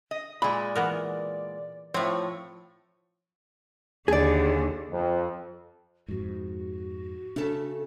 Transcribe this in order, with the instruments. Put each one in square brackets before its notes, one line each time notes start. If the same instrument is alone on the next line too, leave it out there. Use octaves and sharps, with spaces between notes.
[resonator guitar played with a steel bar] D#5
[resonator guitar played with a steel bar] A#2 G#3 [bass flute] D5 [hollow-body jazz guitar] B5
[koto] E3 B3 A#4
[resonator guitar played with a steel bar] A2 C#5 [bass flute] F3 [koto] C4
[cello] D#2 D3 [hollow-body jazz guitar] G#4 D5
[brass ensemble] F2
[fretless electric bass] F2 G#2 [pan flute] F#4
[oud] C#3 A3 A4 [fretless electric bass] D4